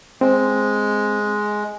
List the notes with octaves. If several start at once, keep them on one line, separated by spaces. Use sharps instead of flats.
G#3 C4